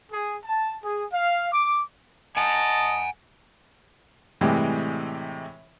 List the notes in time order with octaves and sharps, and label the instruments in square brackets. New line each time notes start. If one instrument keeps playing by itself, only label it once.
[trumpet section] G#4
A5
G#4
F5
D6
[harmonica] D#5 A5 [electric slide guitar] F#5 G#5
[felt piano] A2 C3 E3 G3 G#3